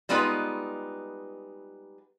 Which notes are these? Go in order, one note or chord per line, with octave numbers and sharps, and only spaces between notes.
G3 G#3 B3 D#4 F4 B4